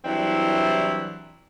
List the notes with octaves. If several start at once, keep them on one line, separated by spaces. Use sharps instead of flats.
E3 F#3 G3 C4 D4 E4